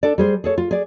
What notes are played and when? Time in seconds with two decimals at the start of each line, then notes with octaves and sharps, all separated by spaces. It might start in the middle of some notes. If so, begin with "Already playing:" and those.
0.03 D4 A4 D5
0.18 G3 G#4 C5
0.44 G#4 A4 C#5
0.58 F4
0.71 G#4 D5